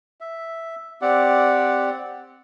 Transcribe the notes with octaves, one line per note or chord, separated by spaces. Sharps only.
E5
C4 G4 D5 F#5